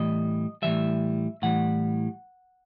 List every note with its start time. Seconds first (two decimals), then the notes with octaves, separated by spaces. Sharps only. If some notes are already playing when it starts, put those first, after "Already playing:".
Already playing: A2 E3 G3 D#5
0.62 A2 E3 G3 E5
1.42 A2 E3 G3 F#5